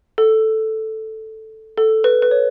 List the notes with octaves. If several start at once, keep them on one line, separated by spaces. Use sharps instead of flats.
A4
A4
B4
B4
C#5